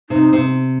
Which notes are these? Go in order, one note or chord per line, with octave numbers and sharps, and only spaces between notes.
C3 D#4
C3